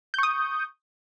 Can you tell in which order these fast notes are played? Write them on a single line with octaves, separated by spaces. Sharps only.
G6 C#6 D#6